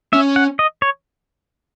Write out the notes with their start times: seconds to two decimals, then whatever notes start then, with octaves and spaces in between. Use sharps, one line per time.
0.13 C#4 E5
0.36 F#5
0.59 D#5
0.82 C#5